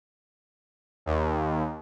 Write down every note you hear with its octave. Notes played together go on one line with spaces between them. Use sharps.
D#2